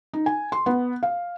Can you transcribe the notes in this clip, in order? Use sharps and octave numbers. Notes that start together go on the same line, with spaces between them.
D#4
G#5
C6
B3
F5